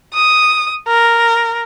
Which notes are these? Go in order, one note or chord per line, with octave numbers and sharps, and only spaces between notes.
D#6
A#4